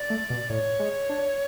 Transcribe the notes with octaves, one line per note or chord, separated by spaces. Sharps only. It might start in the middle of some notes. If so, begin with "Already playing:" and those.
Already playing: D5
A3
B2
A2 C#5
G#3
D4